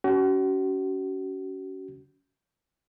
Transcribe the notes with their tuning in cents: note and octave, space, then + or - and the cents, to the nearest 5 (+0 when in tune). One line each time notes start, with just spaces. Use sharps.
C#4 +25 F#4 +35